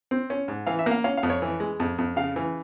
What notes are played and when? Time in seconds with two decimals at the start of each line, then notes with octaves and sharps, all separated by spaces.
0.11 C4
0.30 C#4
0.48 G#2
0.67 E3 F5
0.79 E5
0.86 A#3
0.91 F5
1.04 C#4 F5
1.17 F5
1.23 F2
1.30 C#5
1.42 E3
1.60 G#3
1.80 F2
1.98 F2
2.16 C#3 F5
2.36 E3